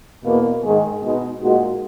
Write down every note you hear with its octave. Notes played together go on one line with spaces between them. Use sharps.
E2 B2 A#3
G#2 D#3 G#3 D#4 G#4
B2 G#3 D#4
A#2 G#3 D#4 F#4